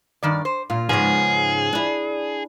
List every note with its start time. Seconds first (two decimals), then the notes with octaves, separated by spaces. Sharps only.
0.23 G2 D#3 D5
0.45 C5
0.70 A#2 F4
0.89 G#2 C#3 F3 G#3 B3 G#4
1.73 D4 E4